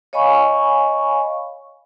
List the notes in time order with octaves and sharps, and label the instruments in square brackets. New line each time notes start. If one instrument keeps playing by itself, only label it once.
[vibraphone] C#5 D#5 F5 G#5 B5 C#6